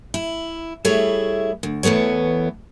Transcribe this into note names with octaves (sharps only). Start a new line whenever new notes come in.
E4
G3 A3 E4 G#4 C#5 E5
D2
E2 E3 A3 B3 C#5